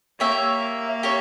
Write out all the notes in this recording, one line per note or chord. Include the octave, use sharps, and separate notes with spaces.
A#3 G4 C#5 E5
G4 C#5